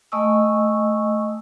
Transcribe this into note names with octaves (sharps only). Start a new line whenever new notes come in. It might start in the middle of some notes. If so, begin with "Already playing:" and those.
A3 D#5 G#5 C#6 D#6 E6